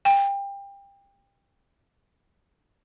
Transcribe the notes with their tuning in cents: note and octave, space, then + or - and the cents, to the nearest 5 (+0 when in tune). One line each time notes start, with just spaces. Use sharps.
G5 +25